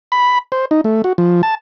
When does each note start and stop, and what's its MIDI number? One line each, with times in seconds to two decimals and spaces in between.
0.12 0.38 83
0.52 0.65 72
0.71 0.81 63
0.84 1.02 57
1.04 1.13 66
1.18 1.42 53
1.43 1.55 81